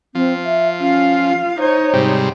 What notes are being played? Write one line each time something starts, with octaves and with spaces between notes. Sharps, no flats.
F3 C4
E5
C#4 F4 F5
D#4 C5 C#5
G#2 C3 G3